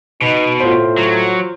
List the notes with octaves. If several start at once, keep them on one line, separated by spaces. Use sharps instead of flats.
B2 D#4
A2 F4 C5
F#3